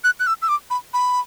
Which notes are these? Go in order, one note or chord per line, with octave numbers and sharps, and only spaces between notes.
F#6
F#6
E6
E6
D6
B5
B5